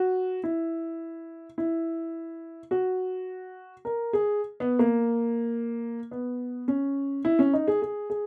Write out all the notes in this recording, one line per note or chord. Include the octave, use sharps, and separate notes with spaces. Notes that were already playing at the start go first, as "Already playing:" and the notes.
Already playing: F#4
E4
E4
F#4
A#4
G#4
B3
A#3
B3
C#4
E4
C#4
D#4
G#4
G#4
G#4